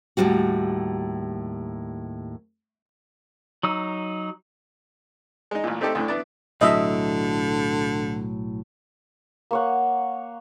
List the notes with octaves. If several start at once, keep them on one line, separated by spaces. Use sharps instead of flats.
D#2 A2 C3 G3 F#4
F#3 D#4 E6
G#3 D#4
A1 A#2
A3 C4 D#4 G4 A4
D2 A2 D3
B3 D4 E4 D5
B1 A2 D3 F#3 D#5 E5
A#3 C#5 F#5